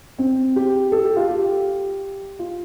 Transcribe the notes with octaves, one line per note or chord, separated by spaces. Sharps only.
C4
G4
A4
G4
F4
G4
F4